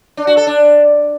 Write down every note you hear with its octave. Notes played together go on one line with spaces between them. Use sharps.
D4
F#4
A4
D4